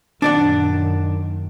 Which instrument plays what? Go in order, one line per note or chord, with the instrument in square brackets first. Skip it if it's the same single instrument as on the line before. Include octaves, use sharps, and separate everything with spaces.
[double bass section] F#2 A#2 D#3 [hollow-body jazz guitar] D4 D5 F#5